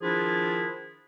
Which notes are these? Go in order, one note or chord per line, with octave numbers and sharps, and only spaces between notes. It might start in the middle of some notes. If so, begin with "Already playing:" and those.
D#3 F3 D4 E4 F4 G#4